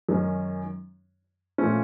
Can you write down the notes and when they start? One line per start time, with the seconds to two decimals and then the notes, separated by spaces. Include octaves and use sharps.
0.09 F#2 D#3 G#3 C#4
1.58 A#2 F3 A3 C#4